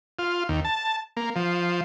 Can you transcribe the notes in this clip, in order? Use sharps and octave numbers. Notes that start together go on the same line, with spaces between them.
F4
D#2
A5
A#3
F3